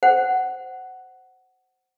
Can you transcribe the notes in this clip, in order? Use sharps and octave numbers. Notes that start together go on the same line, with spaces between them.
C5 F#5